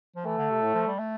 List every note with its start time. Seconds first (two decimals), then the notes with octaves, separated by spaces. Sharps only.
0.16 F3
0.26 E3 A3
0.38 D3
0.51 C3
0.62 A2
0.74 F3
0.87 G3
0.99 A3